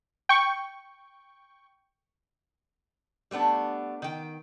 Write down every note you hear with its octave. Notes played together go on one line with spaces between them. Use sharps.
G5 C#6
G3 A3 B3 D4
D#3 G5